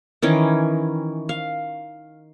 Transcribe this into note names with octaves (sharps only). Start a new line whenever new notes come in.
D#3 E3 C#4
F5